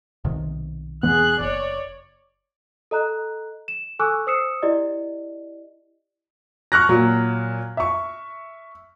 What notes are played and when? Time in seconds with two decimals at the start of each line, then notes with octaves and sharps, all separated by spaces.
0.24 B1 C3 D#3
1.03 E1 E3 B3 G#4 F#6
1.39 F#1 C#5 D5
2.91 A4 D#5 A#5 F#6
3.68 E7
3.99 A4 G#5 C#6 D6 E6 F#6
4.27 C5 D#6 E6 C7 C#7 E7
4.62 E4 G4 D5 D#5
6.72 C#6 F6 F#6 A#6
6.89 A#2 F#3
7.77 E5 C#6